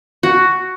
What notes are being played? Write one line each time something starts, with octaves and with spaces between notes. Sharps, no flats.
F#4